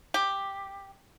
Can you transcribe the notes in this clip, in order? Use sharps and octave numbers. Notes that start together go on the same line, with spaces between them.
G4